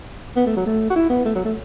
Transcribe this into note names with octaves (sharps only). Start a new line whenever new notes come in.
B3
A3
F#3
A3
F#4
E4
B3
A3
F#3
A3